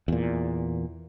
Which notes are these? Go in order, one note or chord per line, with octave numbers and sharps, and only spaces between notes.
E2 A#2